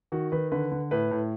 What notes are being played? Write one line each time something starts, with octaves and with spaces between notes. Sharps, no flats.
D#3 F#4
D#3 B4
D3 B4
D3
A2 B4
A2